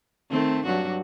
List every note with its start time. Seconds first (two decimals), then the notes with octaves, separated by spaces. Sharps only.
0.30 D#3 A3 C4
0.65 G2 F#3 F#4